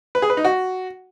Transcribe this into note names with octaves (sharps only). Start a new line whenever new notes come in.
B4
G#4
B4
D#4
F#4